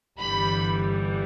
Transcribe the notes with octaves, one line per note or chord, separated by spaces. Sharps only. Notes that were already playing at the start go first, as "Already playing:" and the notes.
G1 G2 E3 G3 B5